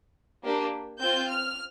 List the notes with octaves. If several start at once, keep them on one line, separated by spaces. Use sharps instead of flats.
A#3 D4 G4
C4 F4 G6
F6